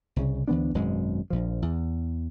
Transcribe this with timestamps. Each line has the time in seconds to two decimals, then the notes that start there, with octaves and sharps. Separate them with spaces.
0.16 C2 C#3
0.48 D2 E3 B3 D4
0.74 G#1 F#2 B2 G#3
1.30 A#1 F3
1.62 E2